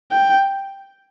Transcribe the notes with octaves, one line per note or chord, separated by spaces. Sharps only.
G5